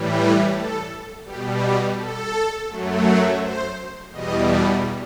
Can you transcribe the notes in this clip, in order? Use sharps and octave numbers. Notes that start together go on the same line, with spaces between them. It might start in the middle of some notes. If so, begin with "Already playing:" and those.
Already playing: A2 E3 G3
B4
A4
B2 G3 G4
G4
A4
F#2 F#3 A3
C5
E2 B2 G3 D#5